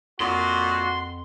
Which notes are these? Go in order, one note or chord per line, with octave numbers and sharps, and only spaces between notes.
F2 A#2 F#4 C6